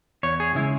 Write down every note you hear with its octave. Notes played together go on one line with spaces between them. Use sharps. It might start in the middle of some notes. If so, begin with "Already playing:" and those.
E2 C#5
G#4
C#3 G#3 E4